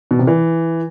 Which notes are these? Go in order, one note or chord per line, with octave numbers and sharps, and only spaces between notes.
B2
C3
E3